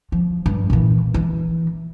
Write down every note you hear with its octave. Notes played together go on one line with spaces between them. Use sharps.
F3
G2
A#2 E3
E3